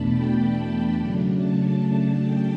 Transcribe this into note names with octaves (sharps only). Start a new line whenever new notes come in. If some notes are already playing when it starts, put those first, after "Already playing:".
Already playing: E2 B2 A3 D4 A5 B5
G5
A5
C#3 F#3 A3 D4
A5
G5